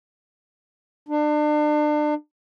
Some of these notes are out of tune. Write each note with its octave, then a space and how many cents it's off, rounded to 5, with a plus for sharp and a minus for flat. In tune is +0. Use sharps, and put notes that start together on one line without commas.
D4 +35